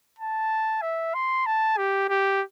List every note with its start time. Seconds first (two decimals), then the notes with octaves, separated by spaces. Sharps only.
0.19 A5
0.82 E5
1.15 C6
1.46 A5
1.77 G4
2.09 G4